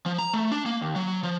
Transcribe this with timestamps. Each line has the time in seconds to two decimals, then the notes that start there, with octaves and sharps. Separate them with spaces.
0.06 F3
0.19 A#5
0.33 A3
0.52 D4
0.66 A#3
0.81 D#2
0.96 F#3
1.23 F3